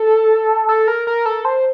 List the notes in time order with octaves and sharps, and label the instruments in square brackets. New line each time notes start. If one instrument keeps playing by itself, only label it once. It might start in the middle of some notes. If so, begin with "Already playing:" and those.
Already playing: [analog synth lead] A4
A4
A#4
A#4
A4
C5